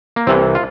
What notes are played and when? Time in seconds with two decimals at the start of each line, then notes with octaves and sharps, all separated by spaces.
0.16 A#3
0.27 C2 C3 E3 C4
0.55 F4